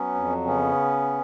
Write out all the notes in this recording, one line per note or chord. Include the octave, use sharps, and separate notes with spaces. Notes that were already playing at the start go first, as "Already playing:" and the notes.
Already playing: F#3 B3 C#4
F2
C#3 B3 C#4